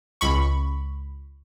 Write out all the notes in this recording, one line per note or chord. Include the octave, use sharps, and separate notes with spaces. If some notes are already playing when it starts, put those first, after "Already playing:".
C#2 B5 C#6